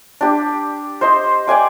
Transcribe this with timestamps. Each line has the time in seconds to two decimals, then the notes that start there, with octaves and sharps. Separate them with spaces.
0.21 D4 G4
1.01 C5 D#5 C6
1.48 D5 G5 G#5 D6